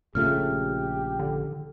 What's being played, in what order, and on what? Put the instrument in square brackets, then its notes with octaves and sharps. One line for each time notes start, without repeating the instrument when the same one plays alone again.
[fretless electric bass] A#1 C#3 A3 [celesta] F4 F6 [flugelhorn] G4
[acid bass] D3